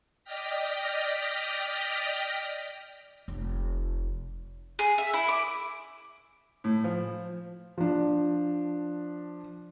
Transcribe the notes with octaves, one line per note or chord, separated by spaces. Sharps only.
D5 D#5 G5 F6 A#6 B6
F1
G#4
E5
E4
D6
A2
F3
F3 D4